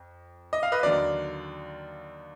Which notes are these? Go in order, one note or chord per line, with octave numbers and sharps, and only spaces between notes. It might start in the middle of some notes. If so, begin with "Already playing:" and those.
Already playing: F2
D#5
F5
B4 D#5
D#2 D3 F#3 D5 F5